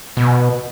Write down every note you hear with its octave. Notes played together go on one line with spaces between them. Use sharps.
B2